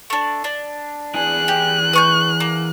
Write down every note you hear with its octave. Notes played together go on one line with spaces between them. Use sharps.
A3 D4
D4
E3 G#4 F#6
G4
B4 C#6 G6
A#3